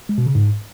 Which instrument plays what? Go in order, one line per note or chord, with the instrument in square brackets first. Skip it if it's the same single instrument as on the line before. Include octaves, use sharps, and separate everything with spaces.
[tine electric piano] G#3
B2
C#3
G#2